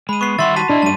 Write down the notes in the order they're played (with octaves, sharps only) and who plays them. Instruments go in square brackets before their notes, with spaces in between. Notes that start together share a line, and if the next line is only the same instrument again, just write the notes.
[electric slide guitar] G#3 [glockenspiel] B5 D#7
[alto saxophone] B3 [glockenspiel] C#6 C7
[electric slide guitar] D#3 G3 F#5 [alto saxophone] E5 [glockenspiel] C6 A6
[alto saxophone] F#4 [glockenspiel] A5 B6 D#7
[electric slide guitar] A#2 G4 D#5 [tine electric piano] D4 [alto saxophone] E4
[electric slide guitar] G2 F#3 G3 [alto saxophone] A3 [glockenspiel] A5 D#7